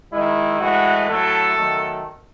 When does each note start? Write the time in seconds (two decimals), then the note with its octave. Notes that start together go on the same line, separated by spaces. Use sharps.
0.12 D#3 G#3 E4
0.60 A2 E3 G#3 F#4
1.08 A2 F#3 A3 A4
1.57 D#3 F#3 A3